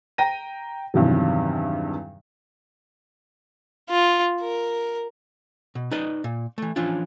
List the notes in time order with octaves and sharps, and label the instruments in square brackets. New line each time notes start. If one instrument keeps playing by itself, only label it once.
[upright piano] G5 A#5 A#6 D#7
E2 G2 C3 D#3 F#3
[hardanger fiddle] F4
A#4
[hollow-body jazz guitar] B2
D#4 B4 D5 D#5
A#2
E3 A3
E3 F3 C#4 D4 F4